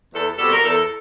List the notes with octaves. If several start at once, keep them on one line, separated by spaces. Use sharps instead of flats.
E2 A4
B2 G3 C4 A4
A#4
E2 A4